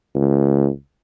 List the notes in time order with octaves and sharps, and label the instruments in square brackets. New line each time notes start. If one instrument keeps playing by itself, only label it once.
[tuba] C#2